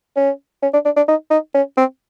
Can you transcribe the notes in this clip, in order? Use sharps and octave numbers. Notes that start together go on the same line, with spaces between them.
C#4
C#4
D4
D4
D4
D#4
D#4
C#4
C4